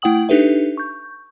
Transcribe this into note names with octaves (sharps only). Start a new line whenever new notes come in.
A3 E4 F#5 G5 D#6 F#7
D4 D#4 G4 A4 B4 E5
C#6 G6